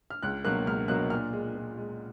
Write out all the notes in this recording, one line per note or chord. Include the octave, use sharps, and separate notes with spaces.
F6
C#2 F#6
B2 F#3 A#3 F#6
C#2 F6
B2 F#3 A#3 F#6
A#2 F6
G#3
A#2
G#3